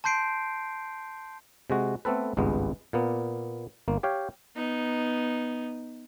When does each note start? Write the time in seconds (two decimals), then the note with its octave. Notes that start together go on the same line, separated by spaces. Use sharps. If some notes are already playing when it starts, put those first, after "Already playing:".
0.04 A5 C6 G6 C7 D7
1.70 C3 G#3 F#4
2.05 A3 B3 C4 A4 B4
2.37 G#1 C#2 G2 G#3 B3
2.93 A#2 A#3 B3
3.88 G1 A#3
4.03 G4 C#5 F5 G5
4.55 B3 D#4